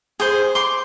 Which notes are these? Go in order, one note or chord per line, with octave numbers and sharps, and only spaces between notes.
G#4 C5
C6 D6